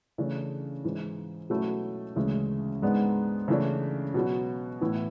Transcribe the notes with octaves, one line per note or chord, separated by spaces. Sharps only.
C#3 E3 A3 D4
G#2 E3 G#3
B2 F#3 A3 C#4 E4
D2 C#3 E3 G#3
G#2 G#3 B3 D4
C#3 E3 A3 D4
B2 F#3 B3
A2 E3 B3 E4